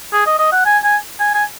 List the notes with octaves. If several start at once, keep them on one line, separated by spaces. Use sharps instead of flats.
G#4
D#5
D#5
F#5
G#5
G#5
G#5
G#5